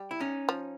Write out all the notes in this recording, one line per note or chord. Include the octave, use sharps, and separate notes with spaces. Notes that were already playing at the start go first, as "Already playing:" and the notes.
Already playing: G3
E4
C#4 D#4
F3